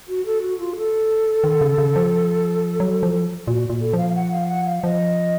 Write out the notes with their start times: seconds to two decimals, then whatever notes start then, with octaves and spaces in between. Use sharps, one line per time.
0.08 F#4
0.26 A4
0.42 F#4
0.59 F4
0.76 A4
1.44 D#3
1.61 C#3
1.78 C#3
1.96 F3
2.80 F#3
3.03 F3
3.47 A#2 F#4
3.70 A#2
3.81 A4
3.93 F3 F5
4.09 F5
4.15 F#5
4.32 F5
4.49 F#5
4.66 F5
4.83 F3 D#5